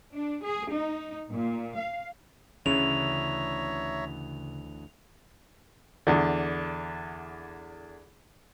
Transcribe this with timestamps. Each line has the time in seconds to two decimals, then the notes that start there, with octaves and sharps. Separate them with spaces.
0.13 D4
0.43 G#4
0.74 D#4
1.31 A#2
1.77 F5
2.66 D2 C#3 E3 C#5 E5 A#5 F7
6.07 E2 D3